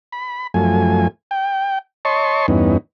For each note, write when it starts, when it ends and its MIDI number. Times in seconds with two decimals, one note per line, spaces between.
0.12 0.47 83
0.54 1.08 42
0.54 1.08 53
0.54 1.08 57
0.54 1.08 80
1.31 1.79 79
2.05 2.46 73
2.05 2.46 75
2.05 2.46 81
2.05 2.46 84
2.05 2.46 85
2.48 2.77 40
2.48 2.77 43
2.48 2.77 59
2.48 2.77 61
2.48 2.77 63